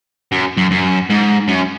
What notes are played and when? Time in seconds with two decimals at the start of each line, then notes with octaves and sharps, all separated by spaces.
0.32 F#2
0.57 F#2
0.71 F#2
1.10 G#2
1.48 F#2